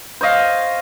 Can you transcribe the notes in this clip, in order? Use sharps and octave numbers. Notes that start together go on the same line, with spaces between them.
C5 C#5 D#5 F5